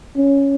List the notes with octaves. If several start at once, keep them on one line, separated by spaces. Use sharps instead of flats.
C#4